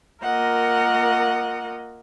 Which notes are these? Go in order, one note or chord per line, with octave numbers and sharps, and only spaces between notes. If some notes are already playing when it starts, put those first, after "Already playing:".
A#3 F4 A#4 D#5 F#5